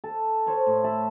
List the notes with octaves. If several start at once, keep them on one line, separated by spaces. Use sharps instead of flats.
A4 A5
C5 C#5 C#6
A2
E5 A5 B5